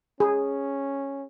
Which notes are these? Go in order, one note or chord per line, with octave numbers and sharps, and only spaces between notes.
C#4 G#4